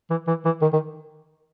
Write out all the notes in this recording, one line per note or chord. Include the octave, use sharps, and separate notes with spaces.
E3
E3
E3
D#3
D#3